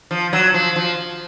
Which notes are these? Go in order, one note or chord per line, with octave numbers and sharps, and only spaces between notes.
F3
F#3
F3
F3